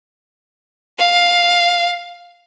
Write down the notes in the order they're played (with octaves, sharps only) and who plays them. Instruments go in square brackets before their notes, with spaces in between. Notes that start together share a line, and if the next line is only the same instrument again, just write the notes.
[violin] F5